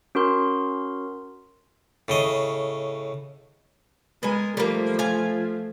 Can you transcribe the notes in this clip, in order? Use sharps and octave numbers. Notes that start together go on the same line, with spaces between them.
C#4 F#4 A#4 C6
A2 C#3 D#5
G#3 B3 A#4 G#5
F3 G3 A3 A#3
F4 G#5